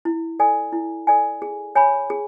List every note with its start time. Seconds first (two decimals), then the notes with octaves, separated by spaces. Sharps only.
0.05 E4
0.40 A4 D5 G#5
0.73 E4
1.07 A4 D5 G#5
1.42 G#4
1.75 C#5 G#5 B5
2.10 G#4